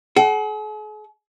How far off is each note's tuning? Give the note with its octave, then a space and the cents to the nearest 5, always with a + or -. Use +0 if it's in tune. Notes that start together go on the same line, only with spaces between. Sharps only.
G#4 +45 F#5 +35